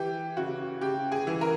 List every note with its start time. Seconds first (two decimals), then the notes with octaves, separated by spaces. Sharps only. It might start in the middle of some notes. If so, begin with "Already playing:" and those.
Already playing: E3 G4
0.37 C#3 F#4
0.81 C#3 G4
1.12 G#4
1.27 E3
1.41 A#4